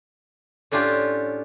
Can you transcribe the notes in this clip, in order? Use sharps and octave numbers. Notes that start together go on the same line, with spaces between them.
A2 C#4 D4 F4 G4